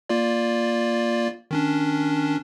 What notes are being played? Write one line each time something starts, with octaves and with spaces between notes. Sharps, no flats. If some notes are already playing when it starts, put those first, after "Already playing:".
A#3 F4 D5
D#3 C#4 D4